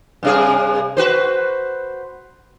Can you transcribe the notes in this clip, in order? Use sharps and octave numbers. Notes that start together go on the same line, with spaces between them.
G2 C3 G#4
F#4 B4 C5